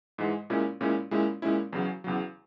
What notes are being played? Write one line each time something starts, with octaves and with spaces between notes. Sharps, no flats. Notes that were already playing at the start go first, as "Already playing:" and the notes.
G#2 E3 G#3
A#2 G#3 C#4 E4
A#2 G#3 C#4 E4
A#2 G#3 C#4 E4
A#2 G#3 C#4 E4
E2 C#3 F#3
E2 C#3 F#3